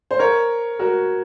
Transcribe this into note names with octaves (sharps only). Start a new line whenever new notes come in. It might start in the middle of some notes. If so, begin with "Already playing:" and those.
C5
A#4 C#5
F#4 A#4